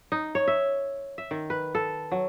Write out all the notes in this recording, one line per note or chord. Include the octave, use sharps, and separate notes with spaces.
D#4
C#5
E5
E5
D#3
B4
A4
F#3